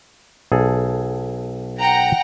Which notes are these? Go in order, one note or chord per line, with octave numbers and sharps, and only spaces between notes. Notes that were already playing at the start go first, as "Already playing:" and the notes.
B1 G#4 A4
F#5 G5 A#5